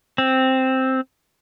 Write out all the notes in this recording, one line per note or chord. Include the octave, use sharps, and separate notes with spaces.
C4